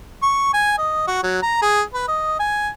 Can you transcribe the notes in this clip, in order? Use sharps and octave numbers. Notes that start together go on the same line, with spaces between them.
C#6
G#5
D#5
F#4
F#3
A#5
G#4
B4
D#5
G#5